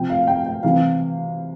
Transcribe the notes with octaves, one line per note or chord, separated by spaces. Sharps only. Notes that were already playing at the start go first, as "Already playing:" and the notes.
Already playing: C3 F3 G5
F5
G5
G5
C3 E3 G3 F5